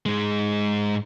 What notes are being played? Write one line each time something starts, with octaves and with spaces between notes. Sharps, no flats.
G#2 G#3